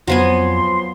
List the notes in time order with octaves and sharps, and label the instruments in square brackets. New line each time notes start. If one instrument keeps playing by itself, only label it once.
[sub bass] F2 [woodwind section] F3 C6 [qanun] F#3 B3 G#5